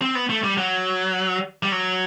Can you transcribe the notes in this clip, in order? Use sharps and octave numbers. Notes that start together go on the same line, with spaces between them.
C4
B3
A3
G3
F#3
G3
F#3